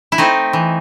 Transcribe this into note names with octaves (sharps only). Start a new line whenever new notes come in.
E4
A3 C4 D#4
E3